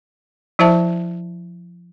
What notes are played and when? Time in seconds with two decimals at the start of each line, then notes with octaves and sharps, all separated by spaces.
0.59 F3 E4 C5 E5 A5